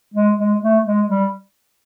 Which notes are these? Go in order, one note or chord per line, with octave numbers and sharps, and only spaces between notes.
G#3
G#3
A3
G#3
G3